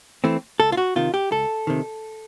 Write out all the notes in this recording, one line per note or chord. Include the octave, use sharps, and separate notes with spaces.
E3 A3 C4
C#2 A4
F4
F#4
C3 D#3 F4
G4
C#2 A4
C3 D#3